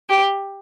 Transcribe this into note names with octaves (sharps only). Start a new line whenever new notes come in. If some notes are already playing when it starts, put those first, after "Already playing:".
G4